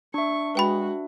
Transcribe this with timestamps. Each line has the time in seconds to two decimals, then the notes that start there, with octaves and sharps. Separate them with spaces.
0.14 D4 E5 C#6
0.55 G#3 F#4 B4 G5 B5